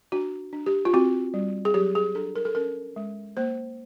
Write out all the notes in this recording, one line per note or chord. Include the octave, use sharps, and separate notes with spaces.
D4 F#4
D4
G4
F4
C4 F#4
G3
G#4
F#3 G4
G#4
D4 A4
A#4
A4
C#4 A#4
G#3
A#3 C5